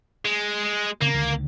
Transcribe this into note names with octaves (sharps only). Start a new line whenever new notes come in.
G#3
C#3 A#3 C4
C#2 D3 D#3